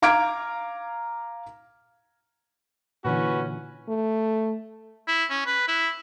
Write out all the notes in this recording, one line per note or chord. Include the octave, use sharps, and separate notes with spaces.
F5 A#5 D6 F6 G#6 D7
A#2 D3 E3 C#4 F#4 B4
A3
E4
C#4
B4
E4